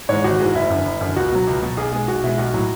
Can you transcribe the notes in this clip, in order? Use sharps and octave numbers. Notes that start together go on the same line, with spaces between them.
G#2 E3 G#3 C#5
G#1 F#4
G#2 E3 G#3
F#1 E4
F#2 D3
F#1
F#2 D3
C#2 F#4
B2 F#3
C#2
B2 F#3
B1 G#4
B2 G#3 G#4
B1 F#4
B2 G#3 E4
B1 F#4
A2 F#3